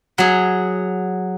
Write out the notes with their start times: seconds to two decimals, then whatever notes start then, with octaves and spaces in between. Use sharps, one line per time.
0.18 F#3 G#4